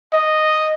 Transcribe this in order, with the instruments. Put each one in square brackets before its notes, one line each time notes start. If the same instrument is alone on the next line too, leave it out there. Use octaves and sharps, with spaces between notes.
[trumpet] D#5